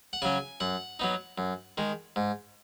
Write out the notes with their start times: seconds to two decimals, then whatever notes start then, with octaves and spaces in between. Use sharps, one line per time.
0.13 F#5
0.22 C#3 F#3 C#4 G#5
0.60 F#2 F#5
0.99 F#3 B3 D#4
1.38 F#2
1.78 D#3 G#3
2.16 G#2